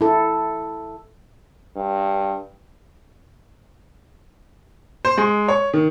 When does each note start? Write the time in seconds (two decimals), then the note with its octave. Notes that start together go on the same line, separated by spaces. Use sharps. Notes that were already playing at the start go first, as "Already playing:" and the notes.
0.01 E4 A4
1.76 G2
5.05 C5
5.18 G#3
5.48 C#5
5.74 D#3